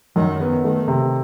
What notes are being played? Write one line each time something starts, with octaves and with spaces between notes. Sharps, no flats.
F#2 D#3
B3
D#3 A3
C3